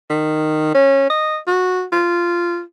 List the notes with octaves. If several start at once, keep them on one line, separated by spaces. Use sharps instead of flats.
D#3
C#4
D#5
F#4
F4